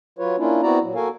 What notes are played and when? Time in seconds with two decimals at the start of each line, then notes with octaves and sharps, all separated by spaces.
0.19 F#3 F4 B4 C#5
0.38 A#3 C#4 D4 E4 F4
0.63 B3 C4 E4 F#4 D5 A#5
0.82 A#2 F#3
0.95 A#3 F#4 A4 A#4 F5 G#5